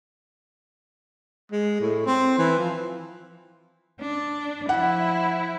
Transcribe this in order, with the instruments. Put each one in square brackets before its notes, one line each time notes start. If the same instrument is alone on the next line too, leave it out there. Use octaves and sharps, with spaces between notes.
[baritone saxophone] G#3
A2
C4
E3
F3
[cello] D4
[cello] F3 E4 [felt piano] F#5